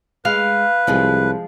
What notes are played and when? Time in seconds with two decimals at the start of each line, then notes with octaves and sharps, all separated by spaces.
0.25 G#3 B4 F5
0.87 C2 F3 G#3 G#4